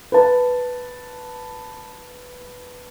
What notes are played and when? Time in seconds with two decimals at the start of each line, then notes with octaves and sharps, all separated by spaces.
0.12 B4 A5